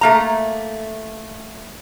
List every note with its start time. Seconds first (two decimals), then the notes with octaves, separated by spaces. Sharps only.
0.01 A3 A#3 A#5